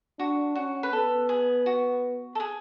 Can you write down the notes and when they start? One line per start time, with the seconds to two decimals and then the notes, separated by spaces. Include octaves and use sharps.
0.19 D4 F#4
0.55 C#4 F#4
0.83 B4
0.92 B3 A4
1.29 G#4
1.66 F#4
2.35 A4
2.40 G#4